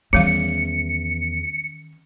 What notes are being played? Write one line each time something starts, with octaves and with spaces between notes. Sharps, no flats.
E2 D#3 E3 G3 C#4 F5 C#7